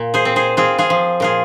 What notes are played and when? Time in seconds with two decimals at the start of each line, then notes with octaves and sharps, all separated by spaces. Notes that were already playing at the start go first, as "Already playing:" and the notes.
Already playing: A#2
0.14 G#4 C5
0.25 C4
0.36 G#4 C5
0.57 C4 F4 G#4
0.78 F4 G#4
0.90 F3
1.20 A#2 F4 G#4